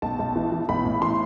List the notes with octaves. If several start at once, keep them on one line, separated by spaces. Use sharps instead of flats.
B1 A5
B1
E3
E3
B1 B5
A2
E3 C6